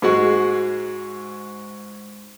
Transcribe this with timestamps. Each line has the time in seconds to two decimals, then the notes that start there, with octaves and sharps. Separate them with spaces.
0.02 G#2 G#3 F#4